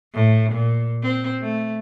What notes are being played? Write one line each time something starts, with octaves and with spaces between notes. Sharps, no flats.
A2
A#2
C4
A3